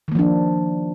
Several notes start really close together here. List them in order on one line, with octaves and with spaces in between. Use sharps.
D#3 A#3 F3 D4